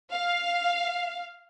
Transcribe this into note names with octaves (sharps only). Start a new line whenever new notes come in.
F5